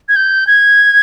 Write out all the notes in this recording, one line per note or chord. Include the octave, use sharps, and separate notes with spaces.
G#6
G6
G#6